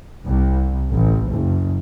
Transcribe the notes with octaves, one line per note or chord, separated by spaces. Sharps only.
C2
A1
F#1